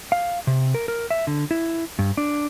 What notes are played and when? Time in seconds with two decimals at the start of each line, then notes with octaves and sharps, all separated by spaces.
0.12 F5
0.47 C3
0.75 A#4
0.88 A#4
1.10 E5
1.27 D3
1.51 E4
1.99 G2
2.17 D4